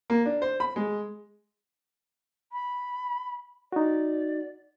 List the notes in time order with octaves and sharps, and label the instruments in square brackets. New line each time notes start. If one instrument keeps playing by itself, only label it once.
[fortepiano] A#3
D4
C5
B5
G#3
[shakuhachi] B5
[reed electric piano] D#4 F#4 [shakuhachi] D5